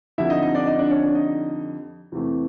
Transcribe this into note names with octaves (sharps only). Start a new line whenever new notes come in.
F2 D3 G3 E4 E5
D#4 D#5
D#4 D#5
D4 D5
D#4 D#5
D4 D5
C#4 C#5
D4 D5
D#4 D#5
E2 C3 E3 A3